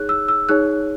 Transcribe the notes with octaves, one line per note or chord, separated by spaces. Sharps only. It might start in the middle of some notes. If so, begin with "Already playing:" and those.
Already playing: D#4 G#4 C#5 F#6
E6
E6
D#4 G#4 C#5 F#6